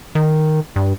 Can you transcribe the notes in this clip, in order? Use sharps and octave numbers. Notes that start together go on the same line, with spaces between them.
D#3
G2